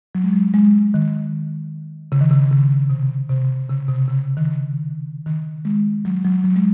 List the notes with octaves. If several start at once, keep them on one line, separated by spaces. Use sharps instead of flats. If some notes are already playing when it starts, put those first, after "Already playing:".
F#3
G#3
F#3
G#3
D#3
C#3
D#3
C#3
C#3
C3
C3
C#3
C3
C#3
D#3
C#3
D#3
G#3
F#3
F#3
F#3
G#3